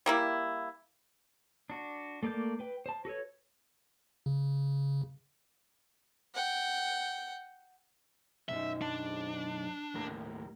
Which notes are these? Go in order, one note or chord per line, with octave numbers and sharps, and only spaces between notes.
G3 A#3 E4
D4 F#4
A3 A#3 D5 A5 G6
B4 G5
C5 A5
F#4 A4 B4 C#5
C#3
F#5 G5
B1 F#2 D#4 E5
D4
D#2 A2 A#4